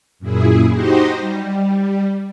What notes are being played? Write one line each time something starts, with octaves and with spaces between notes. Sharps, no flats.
F#2 A#2 E4 G#4
D#4 F#4 G4 C5 D#5
G3